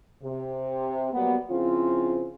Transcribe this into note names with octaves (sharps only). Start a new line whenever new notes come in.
C3
F#3 G3 A#3 B3
C#3 F3 C4 E4 F4